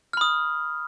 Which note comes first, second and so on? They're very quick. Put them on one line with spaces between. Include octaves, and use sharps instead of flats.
F6 B5 D#6